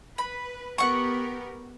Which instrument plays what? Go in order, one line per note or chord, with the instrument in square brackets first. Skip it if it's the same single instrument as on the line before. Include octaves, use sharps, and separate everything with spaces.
[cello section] B4 [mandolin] B5
[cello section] B3 G4 A#4 [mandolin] F#5 C#6